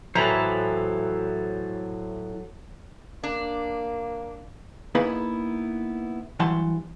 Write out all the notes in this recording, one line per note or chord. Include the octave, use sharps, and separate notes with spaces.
A2 E3 F#3 A4 C5 E5 A#5 B5
A#3 D4
A#3 B3 D#4 E4 G#4 B4
G2 E3 F#3 F#5 A5 C6